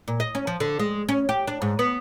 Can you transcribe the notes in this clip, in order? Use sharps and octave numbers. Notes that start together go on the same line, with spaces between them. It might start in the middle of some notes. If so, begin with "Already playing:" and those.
A#2
D#5
C#4
F3
D3
G#3
C#4
G4
D4
G#2
B3